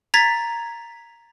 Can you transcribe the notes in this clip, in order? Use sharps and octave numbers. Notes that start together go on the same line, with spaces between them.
A#5 G#6 A6 B6